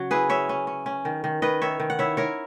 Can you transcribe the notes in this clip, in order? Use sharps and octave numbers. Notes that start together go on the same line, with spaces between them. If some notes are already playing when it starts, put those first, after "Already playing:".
Already playing: C#3 F#3 F#4
E4 G#4 B4
C#4 C#5 E5
C#4
C#4
C#4
D#3
D#3
D#3 B4 D#5
D#3 C#5 E5
D#3
F#5
E4 C#5 E5
E4 A#4 C#5